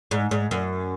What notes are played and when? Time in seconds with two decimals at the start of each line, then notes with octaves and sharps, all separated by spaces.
0.11 G#2
0.31 G#2
0.51 F#2